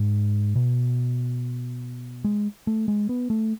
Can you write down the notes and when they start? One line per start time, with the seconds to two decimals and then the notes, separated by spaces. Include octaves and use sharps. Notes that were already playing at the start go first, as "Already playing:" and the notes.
Already playing: G#2
0.56 B2
2.24 G#3
2.67 A3
2.88 G#3
3.09 B3
3.30 A3